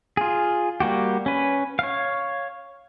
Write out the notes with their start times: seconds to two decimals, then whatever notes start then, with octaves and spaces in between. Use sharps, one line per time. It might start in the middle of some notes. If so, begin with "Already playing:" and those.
0.17 F4 G#4
0.80 G3 A#3 F#4 G4
1.26 C#4 B4
1.79 C#5 F5